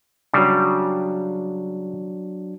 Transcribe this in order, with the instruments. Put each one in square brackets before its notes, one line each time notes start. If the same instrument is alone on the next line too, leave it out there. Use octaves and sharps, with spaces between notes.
[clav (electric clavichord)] C#3 G3 [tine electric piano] F#3 D4